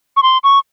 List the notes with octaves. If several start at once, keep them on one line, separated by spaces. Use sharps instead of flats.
C#6
C6
C#6